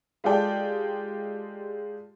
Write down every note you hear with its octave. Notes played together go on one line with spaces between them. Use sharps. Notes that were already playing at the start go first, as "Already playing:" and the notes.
G#3 F4 G4 A4 D5 G5